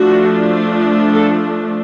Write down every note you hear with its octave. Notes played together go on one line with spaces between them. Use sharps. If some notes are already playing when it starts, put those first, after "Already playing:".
Already playing: F3 A3 D4 F#4
A4